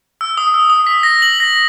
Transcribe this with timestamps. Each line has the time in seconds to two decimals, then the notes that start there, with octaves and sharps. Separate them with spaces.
0.21 E6
0.37 D#6
0.54 E6
0.70 D#6
0.87 B6
1.03 A#6
1.22 F#7
1.40 A#6